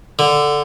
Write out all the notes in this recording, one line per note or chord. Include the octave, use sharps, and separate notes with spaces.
D3